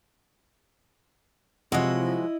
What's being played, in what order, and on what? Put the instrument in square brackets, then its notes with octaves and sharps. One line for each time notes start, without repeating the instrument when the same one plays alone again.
[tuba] C3 [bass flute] F3 [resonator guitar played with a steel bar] F#3 G#3 F#4 [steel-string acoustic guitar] E4 D#5